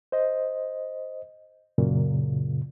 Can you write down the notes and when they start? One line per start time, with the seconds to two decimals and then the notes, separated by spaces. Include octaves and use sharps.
0.12 C5 D#5
1.78 F#2 A#2 C#3